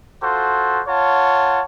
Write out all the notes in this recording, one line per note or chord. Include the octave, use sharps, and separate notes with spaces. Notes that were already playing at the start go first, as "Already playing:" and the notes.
F4 F#4 A4 C5
F4 C#5 F#5 A5